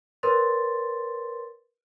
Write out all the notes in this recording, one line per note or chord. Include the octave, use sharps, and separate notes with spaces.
A#4 B4 C#5 C6 A6